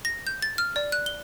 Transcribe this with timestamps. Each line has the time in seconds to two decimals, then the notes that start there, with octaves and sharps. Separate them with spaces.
0.05 A#6
0.27 G6
0.42 A6
0.58 F6
0.76 D5
0.92 F#6
1.06 G7